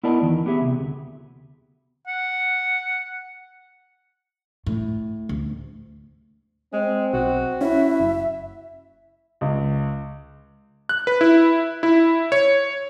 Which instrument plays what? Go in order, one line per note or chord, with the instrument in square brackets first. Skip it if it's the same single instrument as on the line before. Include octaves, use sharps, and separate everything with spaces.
[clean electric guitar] B3 E4 A#4 D5 D#5 A5
E2 D#3 E3
B3 G4 G#4 E5
C2 C3
D2
[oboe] F#5
[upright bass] A2
D2
[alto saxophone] G#3 [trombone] C4
[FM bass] B1 [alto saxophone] F#4
[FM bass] C#4 [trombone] E4 [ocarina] E5
[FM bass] F#1
[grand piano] C#2
[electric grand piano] F#6
B4
E4
E4
C#5